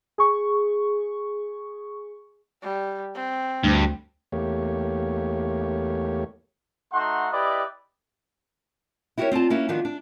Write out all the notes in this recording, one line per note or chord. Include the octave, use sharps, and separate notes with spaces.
G#4 C#6
G3
C4
D2 G2
E2 A3 A#3 G4 C#5
A3 D#4 F#4 F#5 C6
E4 G4 B4 D5 D#5
E4 F#4 G4 A4 A#4 C#5
C4 F4 D5 A5
A#3 C#4 E4 F#4
D#3 F3 B3 D4 F#4
D4